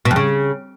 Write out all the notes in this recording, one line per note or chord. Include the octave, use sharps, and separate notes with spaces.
B2
F2
C#3